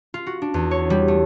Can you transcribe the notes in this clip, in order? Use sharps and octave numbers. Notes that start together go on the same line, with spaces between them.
F4
F#4
D4
E2
C#5
G3
A3